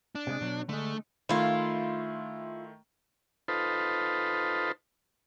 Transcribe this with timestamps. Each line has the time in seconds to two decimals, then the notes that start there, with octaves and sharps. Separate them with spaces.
0.15 D4
0.27 C3 G#3
0.41 B2 F#3
0.69 D3 G#3 A3
1.29 D#3 A3 E4 F4
3.48 D#4 F4 A4 B4 C5